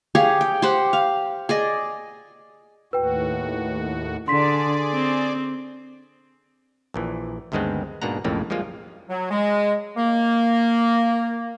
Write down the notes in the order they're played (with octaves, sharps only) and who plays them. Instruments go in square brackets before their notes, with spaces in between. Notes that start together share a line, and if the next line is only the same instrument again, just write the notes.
[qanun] G4 G#4 C#5 F5
G5
G4 C5 F#5
F5
G#4 D5 D#5
[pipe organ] D#2 A2 F#4 [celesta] B4 G5
[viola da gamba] D3 [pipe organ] G#4 D5 [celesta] C6 B6
[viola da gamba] C4
[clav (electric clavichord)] A#1 A#2 E3
D2 G2 D#3 G#3 B3 C4
G#2 B2 A#3 D4 F#5 A#5
B1 F2 A2 C#3 A#3
F3 G3 G#3 A#3 F4
[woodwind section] F#3
G#3
A#3